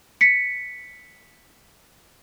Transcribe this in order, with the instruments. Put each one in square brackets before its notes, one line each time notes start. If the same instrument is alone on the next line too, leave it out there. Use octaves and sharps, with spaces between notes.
[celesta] B6 C#7